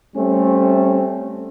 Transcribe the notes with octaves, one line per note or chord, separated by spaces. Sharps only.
G3 A3 C4 C#4